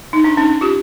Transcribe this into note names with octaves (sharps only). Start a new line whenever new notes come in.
D#4
D4 E4
C#4 D#4
C#4
F4 G4